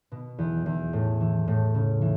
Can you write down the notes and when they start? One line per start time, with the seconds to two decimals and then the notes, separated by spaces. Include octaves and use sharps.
0.12 B2
0.38 E2
0.66 E2
0.93 A2
1.21 E3
1.48 A2
1.75 C#3
2.01 E3